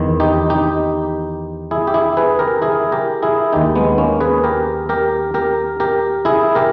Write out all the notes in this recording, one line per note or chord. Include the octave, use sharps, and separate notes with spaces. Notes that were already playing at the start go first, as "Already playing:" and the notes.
Already playing: E2 D#3
D#4 G4
D#4 G4
E4 G#4
G4
E4 G#4
G#4 B4
G4 A#4
E4 G#4
G4 A#4
E4 G#4
D#2 D#3 D#4 G4
G#3 B3
A#3 C#4
G#4 B4
G4 A#4
G4 A#4
G4 A#4
G4 A#4
E4 G#4
G4 A#4